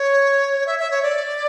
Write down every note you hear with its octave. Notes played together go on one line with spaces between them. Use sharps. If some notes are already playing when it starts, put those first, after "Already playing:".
Already playing: C#5
E5
E5
C#5
D5